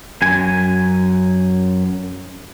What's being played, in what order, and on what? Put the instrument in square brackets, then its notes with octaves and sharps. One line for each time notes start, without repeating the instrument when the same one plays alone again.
[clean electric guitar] F#2 G#5